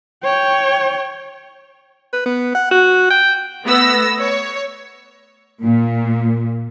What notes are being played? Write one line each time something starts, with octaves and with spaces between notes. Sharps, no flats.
C#5 G5
B4
B3
F#5
F#4
G5
A3 B3 E6 A#6
C#5
A#2